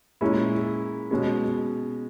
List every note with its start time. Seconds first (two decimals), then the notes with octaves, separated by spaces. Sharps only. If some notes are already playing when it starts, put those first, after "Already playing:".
0.21 A#2 G#3 C#4 E4
1.11 B2 G#3 C#4